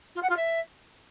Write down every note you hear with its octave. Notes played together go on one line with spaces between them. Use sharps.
F4
F#5
F4
E5